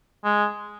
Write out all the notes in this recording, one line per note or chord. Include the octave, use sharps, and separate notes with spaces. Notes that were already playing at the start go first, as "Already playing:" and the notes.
G#3